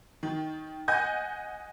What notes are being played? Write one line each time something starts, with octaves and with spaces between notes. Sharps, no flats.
D#3
D#5 F#5 G#5 G6